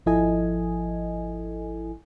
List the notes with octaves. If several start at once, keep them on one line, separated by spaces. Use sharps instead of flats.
G#1 F3 E4 A4 D#5 G#5